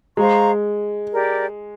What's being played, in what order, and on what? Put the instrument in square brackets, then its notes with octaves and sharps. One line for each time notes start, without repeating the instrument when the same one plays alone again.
[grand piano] G#3 [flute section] C5 F5 A#5 C#6
[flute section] G4 A#4 D5